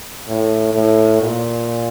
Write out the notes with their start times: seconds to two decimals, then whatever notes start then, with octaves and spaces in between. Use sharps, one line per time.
0.28 A2
0.74 A2
1.22 A#2